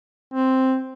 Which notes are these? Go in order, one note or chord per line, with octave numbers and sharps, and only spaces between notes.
C4